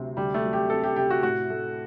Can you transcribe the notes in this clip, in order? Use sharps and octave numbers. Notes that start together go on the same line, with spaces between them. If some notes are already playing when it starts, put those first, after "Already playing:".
Already playing: D2 C3 F#3 C4
D2 G3
A3
F#3
G4
C4 A4
G4
C3 G4
F#4
A2 F#4
A3